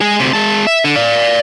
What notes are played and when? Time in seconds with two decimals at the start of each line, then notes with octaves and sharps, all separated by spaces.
0.01 G#3 G#4
0.19 D2 C3
0.33 G#3 A5
0.67 E5
0.84 D3
0.96 D5 F5